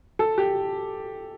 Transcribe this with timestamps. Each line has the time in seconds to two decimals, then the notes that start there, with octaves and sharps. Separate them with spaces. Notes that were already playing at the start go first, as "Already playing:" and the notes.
0.19 A4
0.38 G4